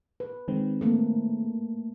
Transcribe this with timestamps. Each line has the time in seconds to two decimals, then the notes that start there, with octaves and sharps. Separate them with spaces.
0.20 B4
0.48 D#3 G#3 C4
0.81 A3 A#3